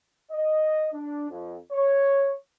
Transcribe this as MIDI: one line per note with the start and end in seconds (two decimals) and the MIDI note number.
0.32 0.88 75
0.93 1.30 62
1.30 1.56 41
1.71 2.33 73